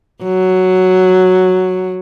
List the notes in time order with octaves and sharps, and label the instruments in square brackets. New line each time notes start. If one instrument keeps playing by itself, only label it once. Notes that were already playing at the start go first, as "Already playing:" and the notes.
[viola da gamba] F#3